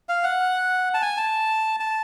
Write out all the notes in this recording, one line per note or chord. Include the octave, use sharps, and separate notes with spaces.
F5
F#5
A5
G#5
A5
A5